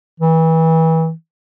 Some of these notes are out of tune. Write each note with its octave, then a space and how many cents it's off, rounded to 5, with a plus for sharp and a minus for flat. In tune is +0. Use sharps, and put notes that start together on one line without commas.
E3 -30